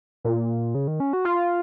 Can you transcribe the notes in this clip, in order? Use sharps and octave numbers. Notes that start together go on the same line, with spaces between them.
A#2
C#3
D#3
C#4
F#4
F4